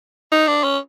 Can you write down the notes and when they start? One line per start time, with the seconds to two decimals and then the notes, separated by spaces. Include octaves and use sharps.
0.32 D#4
0.48 D4
0.63 C#4